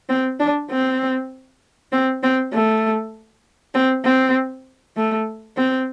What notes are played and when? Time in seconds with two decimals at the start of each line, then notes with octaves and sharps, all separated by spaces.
0.09 C4
0.40 D4
0.71 C4
1.92 C4
2.23 C4
2.53 A3
3.74 C4
4.05 C4
4.97 A3
5.57 C4